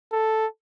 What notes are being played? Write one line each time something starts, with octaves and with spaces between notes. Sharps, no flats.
A4